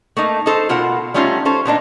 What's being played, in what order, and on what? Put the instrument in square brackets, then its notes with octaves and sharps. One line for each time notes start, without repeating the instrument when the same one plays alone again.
[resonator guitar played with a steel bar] A3 A#3 D#4
D#4 A4 C5
B2 F4 A#4 F#5
G3 A3 C#4 D#4 F4
C#4 A4 C5
A#2 B3 D4 D#4